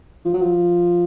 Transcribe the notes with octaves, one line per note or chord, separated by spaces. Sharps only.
F3
F#3
F3